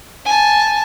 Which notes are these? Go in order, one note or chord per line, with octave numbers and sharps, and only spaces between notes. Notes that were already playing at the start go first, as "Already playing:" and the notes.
G#5 A5